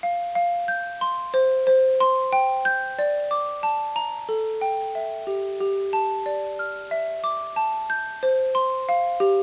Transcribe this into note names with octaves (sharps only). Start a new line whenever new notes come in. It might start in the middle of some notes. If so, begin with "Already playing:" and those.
F5
F5
G6
C6
C5
C5
C6
G5
G6
D5
D6
A5
A#5
A4
G5
E5
G4
G4
A5
D5
F6
E5
D6
A5
G6
C5
C6
F5
G4